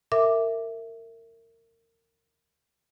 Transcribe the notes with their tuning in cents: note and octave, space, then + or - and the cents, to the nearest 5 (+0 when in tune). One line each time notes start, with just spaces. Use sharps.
A#4 -30 E5 +0 D6 +0